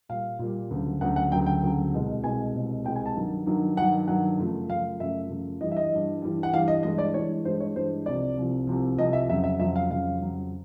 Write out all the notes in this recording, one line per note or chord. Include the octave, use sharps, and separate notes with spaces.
A#2 G3 F5
A#2 G3
D2 C#3 F#3
D2 C#3 F#3 F#5
F#5
D2 C#3 F#3 G5
G5
D2 C#3 F#3
C2 B2 G#3
C2 B2 G#3 G#5
C2 B2 G#3
C2 B2 G#3 G5
G#5
A5
G2 D#3 F#3
G2 D#3 F#3
G2 D#3 F#3 F#5
G2 D#3 F#3 F#5
F#2 C#3 F3 A3
F#2 C#3 F3 A3 F5
F#2 C#3 F3 A3 E5
F#2 C#3 F3 A3
G2 E3 G3 D#5
E5
D#5
G2 E3 G3
G2 E3 G3
F#5
G2 E3 G3 F5
D#5
G2 E3 G#3 D#5
D5
G2 E3 G#3 C#5
G2 E3 G#3 C5
C#5
G2 E3 G#3 C5
C2 C3 F3 D5
C2 C3 F3
C2 C3 F3
C2 C3 F3 D#5
E5
F2 C#3 F#3 E5
E5
F2 C#3 F#3 E5
F5
F2 C#3 F#3 F5
F2 C#3 F#3